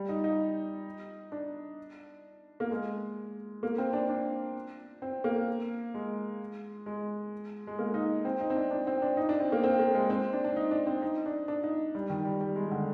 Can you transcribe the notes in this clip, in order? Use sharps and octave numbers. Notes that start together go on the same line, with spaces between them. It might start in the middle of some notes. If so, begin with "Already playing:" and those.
Already playing: G3
D#4
D#4
D4
A#3
G#3
A#3
C4
D4
D4
C4
A#3
G#3
G#3
G#3
A#3
D#4
C4
D#4
C4
D4
D4
C4
D4
D#4
D4
C4
A#3
C4
A#3
G#3
C4
D4
D4
D#4
D4
C4
D#4
D4
D4
D#4
G3
D#3
G3
G3
G#3
D3